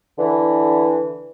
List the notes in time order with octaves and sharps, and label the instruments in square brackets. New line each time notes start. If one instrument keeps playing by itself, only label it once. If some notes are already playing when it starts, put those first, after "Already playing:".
[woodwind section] D3 E3